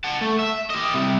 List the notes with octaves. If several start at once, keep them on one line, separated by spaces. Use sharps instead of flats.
F#5 A5
A3
E5
G4 D#5
C3 G3